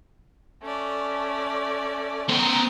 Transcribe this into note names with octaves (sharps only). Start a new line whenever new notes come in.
A3 C#4 D5
B3 C5 G5 A#5 D#6